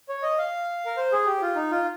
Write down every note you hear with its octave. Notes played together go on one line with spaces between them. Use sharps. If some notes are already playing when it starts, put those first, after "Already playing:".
C#5
D#5
F5
A#4
C5
G#4
G4
F4
D#4
F4